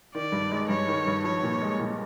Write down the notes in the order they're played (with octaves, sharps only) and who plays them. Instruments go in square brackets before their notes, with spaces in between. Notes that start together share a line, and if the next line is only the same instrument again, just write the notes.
[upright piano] D#3 [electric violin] D5
[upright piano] G2
G#3
[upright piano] G2 [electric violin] C#5
[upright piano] D#3
G2
[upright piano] F3 [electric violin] C#5
[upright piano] A#2
G#3
A#2